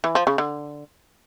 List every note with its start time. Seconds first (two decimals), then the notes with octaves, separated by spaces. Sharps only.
0.04 E3
0.15 F3
0.27 C#3
0.38 D3